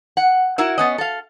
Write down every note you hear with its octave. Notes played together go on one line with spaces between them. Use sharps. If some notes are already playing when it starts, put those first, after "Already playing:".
F#5
E4 F#4 A#4 E5
B3 C#4 D#5
A4 F5